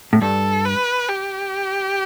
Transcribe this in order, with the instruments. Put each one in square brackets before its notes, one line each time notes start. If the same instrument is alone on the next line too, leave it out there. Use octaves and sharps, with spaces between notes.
[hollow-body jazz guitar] A2
[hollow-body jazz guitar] G2 [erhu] A4
[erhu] B4
G4